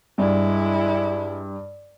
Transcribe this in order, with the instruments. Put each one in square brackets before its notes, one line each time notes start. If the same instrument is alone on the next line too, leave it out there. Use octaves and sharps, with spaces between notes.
[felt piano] G2 [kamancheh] G#3 E4